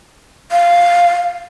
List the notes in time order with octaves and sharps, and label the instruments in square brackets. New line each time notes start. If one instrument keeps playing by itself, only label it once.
[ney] F5